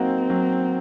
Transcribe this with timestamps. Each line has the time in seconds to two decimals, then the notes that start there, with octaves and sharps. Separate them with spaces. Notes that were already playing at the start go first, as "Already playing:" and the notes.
Already playing: F#3 A#3 C4 D#4 F#4
0.30 F#3